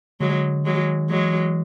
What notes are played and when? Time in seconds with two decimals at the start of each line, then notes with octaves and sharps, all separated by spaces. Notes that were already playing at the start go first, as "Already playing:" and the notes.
0.20 D3 F#3 G#3
0.65 D#3 F#3 G#3
1.10 E3 F#3 G#3